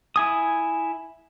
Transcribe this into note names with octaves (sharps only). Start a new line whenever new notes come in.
E4 G#5 D#6